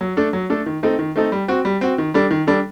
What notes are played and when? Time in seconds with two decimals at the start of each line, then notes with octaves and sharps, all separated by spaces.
0.01 F#3
0.17 A3 D4 A4
0.33 F#3
0.50 A3 D4 A4
0.66 D#3
0.83 A3 C4 D#4 A4
0.99 D#3
1.16 A3 C4 D#4 A4
1.32 G3
1.48 C4 F#4
1.65 G3
1.81 C4 F#4
1.98 D#3
2.14 G3 D4 A4
2.31 D#3
2.47 G3 D4 A4